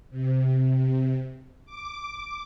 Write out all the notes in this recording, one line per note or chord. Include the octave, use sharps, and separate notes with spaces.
C3
D6